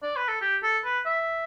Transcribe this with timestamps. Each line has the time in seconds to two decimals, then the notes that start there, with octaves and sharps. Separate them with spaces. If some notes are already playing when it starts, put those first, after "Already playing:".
0.02 D5
0.16 B4
0.28 A4
0.41 G4
0.63 A4
0.84 B4
1.06 E5